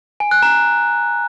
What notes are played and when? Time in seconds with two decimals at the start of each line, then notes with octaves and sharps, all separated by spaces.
0.20 G#5
0.31 F#6
0.43 A#5